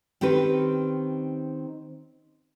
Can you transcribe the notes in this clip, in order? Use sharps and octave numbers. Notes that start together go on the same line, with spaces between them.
D#3 C4 C#4 G4 B4